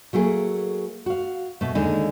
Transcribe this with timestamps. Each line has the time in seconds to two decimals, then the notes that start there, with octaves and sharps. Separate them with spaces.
0.13 F#3 A3 A#3 G#4
1.06 F#4 F5
1.61 B2 A3
1.75 D#2 D3 G#3 D#4